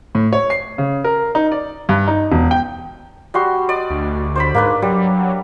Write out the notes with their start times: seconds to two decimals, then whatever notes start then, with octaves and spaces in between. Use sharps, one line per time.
0.15 A2
0.33 C#5
0.50 C7
0.78 C#3
1.05 A#4
1.35 D#4
1.52 D5
1.89 G2
2.08 D#4
2.32 E1
2.51 G5
3.34 G3 F#4 C6
3.69 D5 D#5
3.90 D2
4.36 C5 D5 B5
4.55 G#2 A#3 D4 B4
4.82 F#3 G3